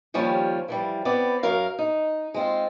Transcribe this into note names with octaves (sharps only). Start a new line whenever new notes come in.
D#2 F3 G3 C#4
E3 F3 G3
B3 C4 D5
F#2 A#4 F5
D#4
G#3 C4 F4